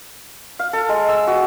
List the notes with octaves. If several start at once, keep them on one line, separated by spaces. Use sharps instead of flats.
F5
A4
G#3
E6
F#4